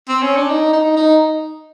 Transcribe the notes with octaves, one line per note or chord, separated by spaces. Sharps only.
C4
C#4
D4
D#4
D#4
D#4